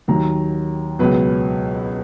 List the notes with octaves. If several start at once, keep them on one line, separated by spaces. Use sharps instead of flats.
D#2 D#3 F#3 A#5
C#2 B2 F#3 B4